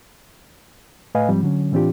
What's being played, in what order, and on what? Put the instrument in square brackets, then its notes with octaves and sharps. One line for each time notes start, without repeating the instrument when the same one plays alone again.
[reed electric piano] A2 A3 B4 D#5 F5 G#5
G#2 F3 G3 C4
D3 F#3 C#4
A2 E3 C4 D4 F4 G4